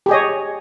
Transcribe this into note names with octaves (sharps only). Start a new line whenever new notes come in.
G4 G#4 C#5 D#5